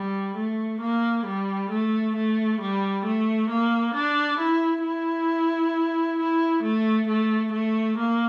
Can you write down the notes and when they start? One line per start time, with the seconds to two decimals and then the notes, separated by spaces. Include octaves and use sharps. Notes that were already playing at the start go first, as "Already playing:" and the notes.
Already playing: G3
0.37 A3
0.81 A#3
1.26 G3
1.71 A3
2.16 A3
2.61 G3
3.05 A3
3.50 A#3
3.95 D4
4.40 E4
4.84 E4
6.19 E4
6.63 A3
7.08 A3
7.53 A3
7.98 A#3